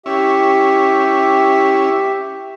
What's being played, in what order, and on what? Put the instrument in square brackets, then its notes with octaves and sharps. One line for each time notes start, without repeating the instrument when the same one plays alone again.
[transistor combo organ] C#4 E4 [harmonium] G4 E5